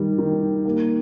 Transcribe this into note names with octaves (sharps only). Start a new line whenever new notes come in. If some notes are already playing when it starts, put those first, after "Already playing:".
Already playing: D#3 G3
D#3
A#3